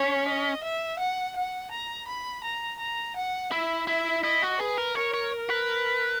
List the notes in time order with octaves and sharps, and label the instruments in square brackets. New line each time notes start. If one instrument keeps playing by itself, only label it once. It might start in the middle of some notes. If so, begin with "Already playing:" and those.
Already playing: [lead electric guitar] C#4 [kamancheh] C#5
[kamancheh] D#5
E5
F#5
F#5
A#5
B5
A#5
A#5
F#5
[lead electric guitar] E4 [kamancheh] E5
[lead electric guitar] E4 [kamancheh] E5
[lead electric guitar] E4 [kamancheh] D#5
[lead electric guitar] F#4
[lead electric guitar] G#4 [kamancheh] B4
[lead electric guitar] A#4
[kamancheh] A#4 [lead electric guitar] C#5
[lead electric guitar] C#5
B4